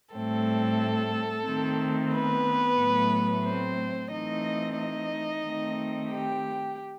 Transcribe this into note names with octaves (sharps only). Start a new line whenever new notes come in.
A2 G3 A3 C4 A4
D#3 A3 C4
B3 B4
A2 F#3 A3
C4 C5
E3 A3 C4 D#4 D#5
D#4 D#5
D#3 A3 C4
G4 G5